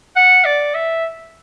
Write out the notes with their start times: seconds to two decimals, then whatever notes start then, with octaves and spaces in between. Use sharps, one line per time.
0.16 F#5
0.45 D5
0.75 E5